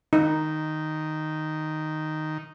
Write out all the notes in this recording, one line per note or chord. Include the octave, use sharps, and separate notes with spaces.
D#3 D#4